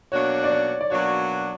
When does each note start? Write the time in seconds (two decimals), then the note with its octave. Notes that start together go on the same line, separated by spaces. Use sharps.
0.12 B2 F#3 A#3 D4 F#4 C#5
0.44 D5
0.51 C#5
0.81 D5
0.90 B2 F#3 A#3 D4 F#4 C#5